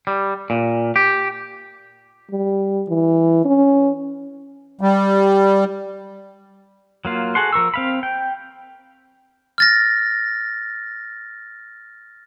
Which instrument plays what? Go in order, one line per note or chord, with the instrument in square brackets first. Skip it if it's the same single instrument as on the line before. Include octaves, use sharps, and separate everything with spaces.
[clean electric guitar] G3
A#2
G4
[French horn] G3
E3
C#4
[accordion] G3
[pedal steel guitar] F#3 A#3 F4
F#4 G#4 A4 F#5 C6
F3 A#4 C#6 E6
C4 F5 B5
G5
[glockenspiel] F6 A6 A#6